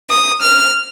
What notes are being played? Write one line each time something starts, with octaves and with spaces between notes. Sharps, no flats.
D#6
F6